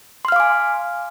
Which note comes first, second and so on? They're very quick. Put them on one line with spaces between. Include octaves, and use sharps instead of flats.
C6 F6 F5 D6 G#5